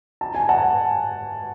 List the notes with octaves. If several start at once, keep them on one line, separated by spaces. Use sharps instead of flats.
A5
G#5
F#5 A5